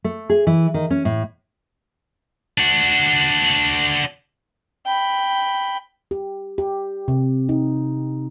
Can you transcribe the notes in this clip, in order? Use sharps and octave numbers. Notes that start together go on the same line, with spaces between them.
A3
G#4
E3
D#3
C#4
A2
D4 F#4
G5 B5
G4
G4
C3
D#4